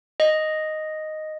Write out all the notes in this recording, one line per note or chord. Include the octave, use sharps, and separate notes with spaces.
D#5